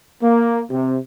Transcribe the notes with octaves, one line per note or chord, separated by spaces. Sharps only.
A#3
C3